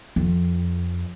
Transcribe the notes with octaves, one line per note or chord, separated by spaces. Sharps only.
F2